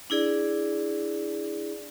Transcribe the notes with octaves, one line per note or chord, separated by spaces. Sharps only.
D4 E4 G#4 D5